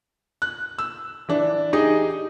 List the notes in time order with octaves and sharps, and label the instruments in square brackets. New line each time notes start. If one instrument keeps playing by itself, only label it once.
[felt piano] F#6
E6
E3 D4
D#4 G4 G#4 D#5